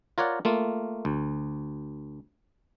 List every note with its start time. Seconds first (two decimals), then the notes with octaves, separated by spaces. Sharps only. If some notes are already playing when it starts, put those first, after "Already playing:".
0.18 F4 A#4 C#5 D5 F#5
0.45 A3 A#3 F4
1.05 D2